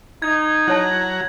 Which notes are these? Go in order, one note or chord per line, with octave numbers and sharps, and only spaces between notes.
D#4 G#6
F#3 E4 C#5 F#5 A5 A#5